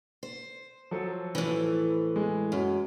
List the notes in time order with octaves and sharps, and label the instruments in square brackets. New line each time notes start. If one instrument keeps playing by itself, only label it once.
[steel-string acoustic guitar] C5
[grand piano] F3 F#3 A4
[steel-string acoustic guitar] A2 E3
[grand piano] G#3
[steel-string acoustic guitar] F#2